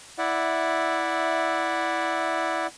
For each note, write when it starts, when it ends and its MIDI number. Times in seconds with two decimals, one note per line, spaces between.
0.18 2.67 64
0.18 2.67 74
0.18 2.67 76
0.18 2.67 78